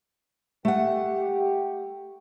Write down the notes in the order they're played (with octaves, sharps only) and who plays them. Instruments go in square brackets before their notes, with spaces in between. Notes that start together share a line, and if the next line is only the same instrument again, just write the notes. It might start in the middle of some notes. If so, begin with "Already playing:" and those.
[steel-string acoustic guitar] A3 F#5 [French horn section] G4